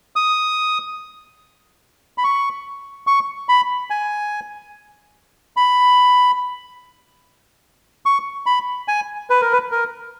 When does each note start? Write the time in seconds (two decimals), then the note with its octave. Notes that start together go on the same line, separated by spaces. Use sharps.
0.16 D#6
2.18 B5
2.24 C#6
3.07 C#6
3.49 B5
3.90 G#5
5.57 B5
8.06 C#6
8.46 B5
8.88 G#5
9.30 B4
9.41 A#4
9.53 B4
9.72 A#4